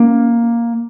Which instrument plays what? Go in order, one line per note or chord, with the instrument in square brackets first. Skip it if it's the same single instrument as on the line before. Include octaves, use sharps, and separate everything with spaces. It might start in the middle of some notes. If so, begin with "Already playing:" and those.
Already playing: [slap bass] A#3 C#4